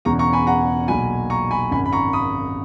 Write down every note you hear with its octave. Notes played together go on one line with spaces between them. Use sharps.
E1 E2 C#3 E3 A#5 C#6
A#5 C#6
G#5 B5
F#5 A#5
B1 A#2 F#3 G#5 B5
A#5 C#6
G#5 B5
G#1 F#2 C#3 G#5 B5
B5
A#5 C#6
B5 D#6